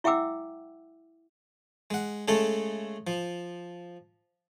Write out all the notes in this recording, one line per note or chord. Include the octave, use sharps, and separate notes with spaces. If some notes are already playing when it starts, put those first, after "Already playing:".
E4 E5 F#5 G5 D6 E6
G#3 F#5
C#3 G#3 A3 A4
F3